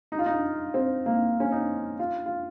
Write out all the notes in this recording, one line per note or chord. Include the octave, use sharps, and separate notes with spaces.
D#4
F4
D#4
C4
A#3
C#4
D#4
F4
F4